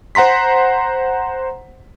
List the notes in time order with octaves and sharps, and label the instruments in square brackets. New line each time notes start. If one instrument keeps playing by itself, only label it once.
[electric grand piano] C5 F#5 A#5 C6 B6